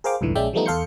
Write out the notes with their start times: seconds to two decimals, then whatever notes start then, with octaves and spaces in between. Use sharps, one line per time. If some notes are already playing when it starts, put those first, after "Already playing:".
0.04 G#4 A#4 C5 F5 G5 D6
0.21 C2 F2 G#2 D3 E3
0.35 A#1 G#3 C#4 D5 E5 G5
0.53 E3 F3 G3 A3 B3 D#4
0.66 E2 A4 F5 C6 G6 C#7